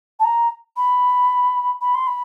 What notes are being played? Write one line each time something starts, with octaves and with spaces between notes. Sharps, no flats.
A5
A#5
B5
B5
C6
B5